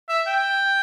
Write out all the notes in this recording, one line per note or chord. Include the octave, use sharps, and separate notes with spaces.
E5
G5